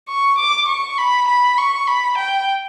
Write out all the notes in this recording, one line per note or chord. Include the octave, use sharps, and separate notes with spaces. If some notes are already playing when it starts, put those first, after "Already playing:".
C#6
D6
C#6
B5
B5
C#6
B5
G5